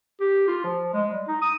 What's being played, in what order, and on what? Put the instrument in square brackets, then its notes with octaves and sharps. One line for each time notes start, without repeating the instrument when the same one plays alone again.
[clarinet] G4
F4
F3
G#3
G3
D#4
D#6